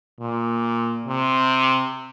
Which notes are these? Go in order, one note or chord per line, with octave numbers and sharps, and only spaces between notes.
A#2
C3